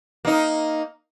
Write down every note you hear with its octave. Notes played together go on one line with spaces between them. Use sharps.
A#3 D#4